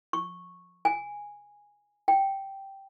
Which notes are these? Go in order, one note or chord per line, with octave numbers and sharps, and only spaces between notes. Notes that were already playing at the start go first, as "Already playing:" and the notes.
C#6
G#5
G5